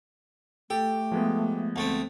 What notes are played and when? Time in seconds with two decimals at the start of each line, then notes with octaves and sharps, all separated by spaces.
0.70 A3 G4 A4
1.12 F3 G#3 B3
1.76 D2 A3 C4